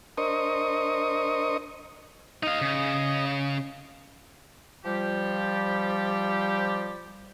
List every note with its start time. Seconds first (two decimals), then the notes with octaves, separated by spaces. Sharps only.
0.18 D4 A#4 C5 D#5 C#6 D#6
2.43 D#4 D#5 F5
2.61 C#3
4.85 F3 G3 G4